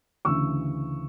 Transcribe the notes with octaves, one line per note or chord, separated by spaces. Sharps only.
D2 C#3 E3 C#6 E6